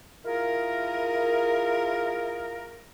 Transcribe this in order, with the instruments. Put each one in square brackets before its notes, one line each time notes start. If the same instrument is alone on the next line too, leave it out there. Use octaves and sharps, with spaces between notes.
[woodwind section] E4 F4 G#4 A#4